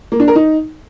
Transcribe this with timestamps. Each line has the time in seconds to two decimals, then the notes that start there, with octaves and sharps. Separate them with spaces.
0.12 A#3
0.20 D4
0.28 A#4
0.36 D#4